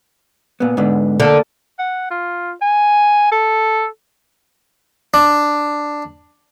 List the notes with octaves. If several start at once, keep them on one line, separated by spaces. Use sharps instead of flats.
A#2 B3
G#2 D3 B3
D3 A3 A#3 A4
F#5
F4
G#5
A4
D4